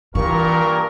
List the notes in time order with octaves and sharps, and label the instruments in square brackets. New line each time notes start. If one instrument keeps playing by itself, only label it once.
[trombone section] G2 A#2 [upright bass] E3 [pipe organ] A#4 [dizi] C#6